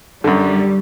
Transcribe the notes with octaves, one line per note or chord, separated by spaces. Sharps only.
F#2 D3 G3